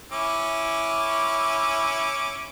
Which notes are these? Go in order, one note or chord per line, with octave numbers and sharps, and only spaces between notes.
C#4 E4 D6